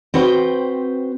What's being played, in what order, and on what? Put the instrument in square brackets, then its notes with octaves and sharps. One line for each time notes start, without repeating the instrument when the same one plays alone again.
[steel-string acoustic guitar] C4 F#4 B4 C5 F5 G5